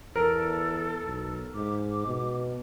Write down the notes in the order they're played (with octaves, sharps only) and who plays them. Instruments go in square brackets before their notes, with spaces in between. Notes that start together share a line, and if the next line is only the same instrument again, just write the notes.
[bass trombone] E2 [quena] A4 [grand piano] A#4
[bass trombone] B1
[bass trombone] G#2 [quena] D6
[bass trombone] B2